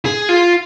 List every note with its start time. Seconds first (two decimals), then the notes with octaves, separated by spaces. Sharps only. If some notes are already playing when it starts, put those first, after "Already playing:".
0.05 G#4
0.29 F4